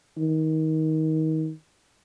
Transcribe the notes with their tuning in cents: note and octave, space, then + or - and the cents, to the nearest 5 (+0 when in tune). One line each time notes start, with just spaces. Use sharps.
D#3 +25